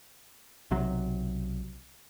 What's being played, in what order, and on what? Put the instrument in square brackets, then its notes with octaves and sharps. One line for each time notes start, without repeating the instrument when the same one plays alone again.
[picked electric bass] B1 C3 F#3